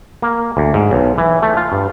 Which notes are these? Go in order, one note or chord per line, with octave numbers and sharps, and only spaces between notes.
A#3
D2
G#2
B1
E3
A3
F4
G2